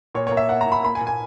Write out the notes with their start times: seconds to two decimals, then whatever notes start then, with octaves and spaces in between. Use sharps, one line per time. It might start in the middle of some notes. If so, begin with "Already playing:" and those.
0.15 A#2 C#5
0.27 C#5
0.32 A#3
0.37 E5
0.49 A#3 F#5
0.61 A#5
0.66 A#2
0.72 B5
0.83 A#3 B5
0.95 G#5
1.01 A#2
1.07 G#5